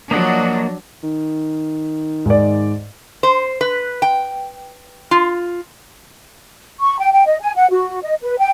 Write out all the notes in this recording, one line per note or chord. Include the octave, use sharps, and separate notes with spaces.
F3 F#3 A#3 D4 D#5 F#5
D#3
G#2 D5
C5
B4
G5
F4
C#6
G5
G5
D#5
G#5
F#5
F#4
D#5
B4
G5